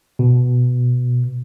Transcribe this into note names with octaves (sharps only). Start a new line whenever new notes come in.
B2